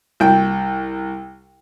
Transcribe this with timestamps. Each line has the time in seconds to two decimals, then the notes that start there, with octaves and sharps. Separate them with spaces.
0.20 C2 G5